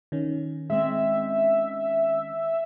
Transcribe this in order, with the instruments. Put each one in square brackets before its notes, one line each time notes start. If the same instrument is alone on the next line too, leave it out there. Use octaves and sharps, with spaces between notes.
[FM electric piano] D#3 C#4
[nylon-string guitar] G#3 C4 [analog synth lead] E5